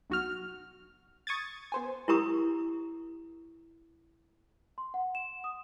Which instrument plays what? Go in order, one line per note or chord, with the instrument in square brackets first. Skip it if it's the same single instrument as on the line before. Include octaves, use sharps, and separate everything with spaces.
[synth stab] B1 F#4 F6
C#6 D#6 G#6 A6
B3 C5 G#5
[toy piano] E4 G4 A#4 A#5 C#6 D#6
[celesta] C6
F#5
E7
D#6